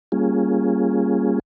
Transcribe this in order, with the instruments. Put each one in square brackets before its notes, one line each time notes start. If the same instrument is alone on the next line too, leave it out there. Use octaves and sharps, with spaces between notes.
[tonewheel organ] G3 A#3 C#4 F4 G#4